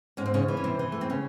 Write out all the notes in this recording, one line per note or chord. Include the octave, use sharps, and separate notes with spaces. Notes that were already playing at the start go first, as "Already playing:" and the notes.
G#2 C#4
C4
C#3 C#4
E3
C#4
C3 C4
E3
A3
C4
C#3 C#4